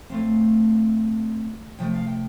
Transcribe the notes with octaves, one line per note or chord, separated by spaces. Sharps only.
A2 A3 C4 F5
C3 F3 A3 G5
F5
G5